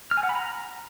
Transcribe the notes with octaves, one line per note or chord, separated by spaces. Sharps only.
F6
G#5
F#5
B5
A#5